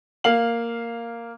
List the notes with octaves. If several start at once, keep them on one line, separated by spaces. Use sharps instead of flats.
A#3 F5 F#7